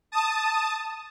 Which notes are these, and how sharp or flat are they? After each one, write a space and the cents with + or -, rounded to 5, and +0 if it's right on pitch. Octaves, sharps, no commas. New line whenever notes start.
A5 +0 D#6 +0